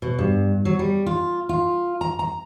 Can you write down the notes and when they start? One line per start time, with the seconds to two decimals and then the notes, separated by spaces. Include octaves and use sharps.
0.02 B2
0.19 G2
0.65 F#3
0.79 G3
1.06 F4
1.49 F4
2.01 A#5
2.19 A#5